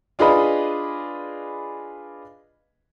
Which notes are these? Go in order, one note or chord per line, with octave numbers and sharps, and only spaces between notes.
D4 F4 G#4 B4 D#5 B5